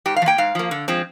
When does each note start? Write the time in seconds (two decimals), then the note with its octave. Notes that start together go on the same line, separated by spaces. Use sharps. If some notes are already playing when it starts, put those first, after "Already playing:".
0.06 G#2 G4
0.16 F5
0.22 F3
0.26 A#3 G5
0.38 G#2 F5
0.55 F3 A#3
0.71 D3
0.88 F3 G#3 C4